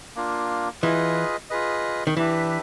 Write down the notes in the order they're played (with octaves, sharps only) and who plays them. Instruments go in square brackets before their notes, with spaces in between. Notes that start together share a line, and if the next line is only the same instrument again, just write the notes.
[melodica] A#3 D4 F4
[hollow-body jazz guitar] E3 [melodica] F4 G#4 B4 D#5
[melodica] F4 G#4 B4 D#5
[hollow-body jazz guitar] D#3
[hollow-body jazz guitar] E3 [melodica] D4 G4 B4 E5